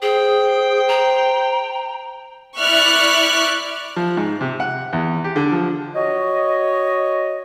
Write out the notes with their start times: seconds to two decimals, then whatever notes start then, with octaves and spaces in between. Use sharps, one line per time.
0.02 G#4 C5 G5
0.88 A#5
2.58 E4 D5 E5 C#6 F6 F#6
3.96 F3
4.17 G#2
4.41 C3
4.60 F#5
4.93 E2
5.24 G4
5.36 D3
5.52 F3
5.95 F#4 C#5 D#5